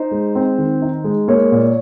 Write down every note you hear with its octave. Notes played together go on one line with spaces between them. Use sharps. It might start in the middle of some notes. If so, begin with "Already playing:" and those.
Already playing: D#4 C5
G#3
C4
D#3
D#4
G#3
A#3 C#5
A#2